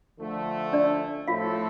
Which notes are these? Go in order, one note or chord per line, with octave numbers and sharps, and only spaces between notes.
D3 F3 A3
D4 D5
A2 F3 A3 C4 F4 A4 F5